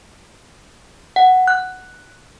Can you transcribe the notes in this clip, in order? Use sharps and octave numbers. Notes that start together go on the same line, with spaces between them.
F#5
F#6